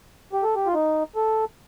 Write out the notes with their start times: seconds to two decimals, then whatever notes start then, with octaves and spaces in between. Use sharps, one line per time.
0.33 G4
0.43 A4
0.55 G4
0.66 F4
0.74 D#4
1.15 A4